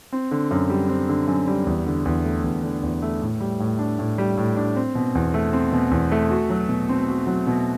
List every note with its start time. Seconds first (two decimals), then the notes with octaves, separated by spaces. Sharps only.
0.13 C4
0.31 D3
0.51 F#2
0.69 G3
0.89 C4
1.09 D3
1.27 F#2
1.48 G3
1.67 E2
1.87 D3
2.05 E2
2.24 A3
2.44 E2
2.63 D3
2.83 E2
3.02 A3
3.22 A2
3.40 G3
3.60 A2
3.79 D4
3.99 A2
4.18 G3
4.37 A2
4.56 D4
4.76 C4
4.95 B2
5.15 E2
5.34 A3
5.53 C4
5.73 B2
5.91 E2
6.11 A3
6.31 F#4
6.50 F#3
6.69 B2
6.89 C4
7.08 F#4
7.27 F#3
7.47 B2